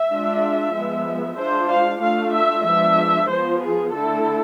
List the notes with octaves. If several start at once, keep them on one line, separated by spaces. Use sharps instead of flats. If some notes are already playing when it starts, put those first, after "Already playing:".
Already playing: E5
G#3 D4 F4
F3 G#3 B3
G#3 D4 F4 C5
F5
A3 D4 F4 F5
E5
F3 G#3 B3 D4 E5
F3 B3 F4 C5
G#4
D3 A3 E4 A4